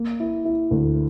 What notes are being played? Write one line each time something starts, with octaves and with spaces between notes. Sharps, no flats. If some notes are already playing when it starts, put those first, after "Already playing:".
Already playing: A#3
E4
E4
D2